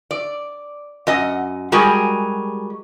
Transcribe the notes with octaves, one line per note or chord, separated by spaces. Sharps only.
D5
F#2 D#5 F#5
G3 G#3 F#4 G#4 A#4